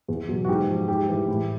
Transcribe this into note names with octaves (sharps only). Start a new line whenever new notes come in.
E2
B2 F#3
F#4
G#2 G4
F3
G#2 G4
E3 G3
A2